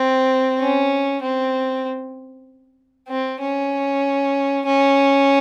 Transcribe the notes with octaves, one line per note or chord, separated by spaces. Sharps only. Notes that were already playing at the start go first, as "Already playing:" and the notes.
Already playing: C4
C#4
C4
C4
C#4
C#4